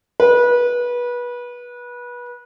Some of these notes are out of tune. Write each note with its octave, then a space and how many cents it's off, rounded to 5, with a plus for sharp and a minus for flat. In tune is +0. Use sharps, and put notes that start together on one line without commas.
B4 -25